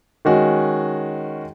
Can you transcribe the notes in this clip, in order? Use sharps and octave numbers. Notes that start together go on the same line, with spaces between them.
D#3 G#3 C#4 F#4